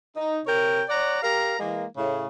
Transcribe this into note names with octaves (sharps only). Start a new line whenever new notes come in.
D#4
C3 A#4 C#5 G5
C#5 D5 F#5 A#5
G4 A#4 F5 A#5
E3 G#3 A#3
A2 C#3